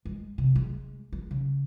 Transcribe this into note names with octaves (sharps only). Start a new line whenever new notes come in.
G#3
C3
G#3
G#3
C#3